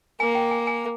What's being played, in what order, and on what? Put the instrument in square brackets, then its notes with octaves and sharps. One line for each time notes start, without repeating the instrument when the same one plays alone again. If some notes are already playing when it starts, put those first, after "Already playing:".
[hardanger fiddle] A#3 [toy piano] G#5
[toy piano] G5
G#5
G#5